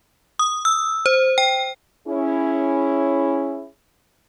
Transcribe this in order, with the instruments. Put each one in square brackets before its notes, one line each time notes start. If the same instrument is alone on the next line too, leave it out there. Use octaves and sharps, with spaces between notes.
[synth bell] D#6
E6
C5
G5
[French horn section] C#4 E4 G#4